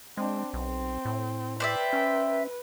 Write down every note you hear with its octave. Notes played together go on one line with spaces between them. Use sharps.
G#3 C4 D4
B1 C4
A2
B4 C5 D5 E5 G5
C#4
B4